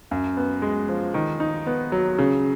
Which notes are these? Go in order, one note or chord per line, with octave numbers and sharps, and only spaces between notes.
F#2
B3
G#3
F3
D#3
D#4
B3
F#3
C#3